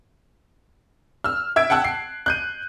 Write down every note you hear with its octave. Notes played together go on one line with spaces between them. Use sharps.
E6 F6
E5 E6 G#6 D7
F#5 G5 A5 E6 F#6
C7
F#6 G6 D#7